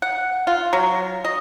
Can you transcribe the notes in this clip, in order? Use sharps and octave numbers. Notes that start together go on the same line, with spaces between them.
F#5
F4
F#3
D#5